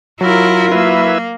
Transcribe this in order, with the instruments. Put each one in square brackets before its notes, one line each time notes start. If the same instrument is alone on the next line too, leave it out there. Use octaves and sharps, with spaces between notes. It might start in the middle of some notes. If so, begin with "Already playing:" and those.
[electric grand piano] F#3 [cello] E4 A#4 [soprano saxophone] F4
[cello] A#3 [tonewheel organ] E4 B4 E5